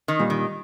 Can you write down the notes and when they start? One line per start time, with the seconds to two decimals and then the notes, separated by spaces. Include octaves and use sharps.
0.08 D#3
0.20 A#2 G3
0.30 D#3